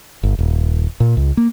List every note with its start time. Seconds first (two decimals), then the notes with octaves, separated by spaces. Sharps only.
0.23 G1
0.39 D#1
1.00 A#2
1.17 C#2
1.37 A#3